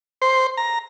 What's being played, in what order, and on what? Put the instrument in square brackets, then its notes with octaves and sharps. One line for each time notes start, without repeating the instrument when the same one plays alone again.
[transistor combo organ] C5
A#5